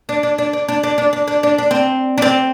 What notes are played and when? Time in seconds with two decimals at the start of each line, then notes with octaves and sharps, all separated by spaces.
0.09 D4
0.23 D4
0.38 D4
0.53 D4
0.68 D4
0.83 D4
0.98 D4
1.13 D4
1.28 D4
1.43 D4
1.58 D4
1.71 C4
2.18 D4
2.22 C4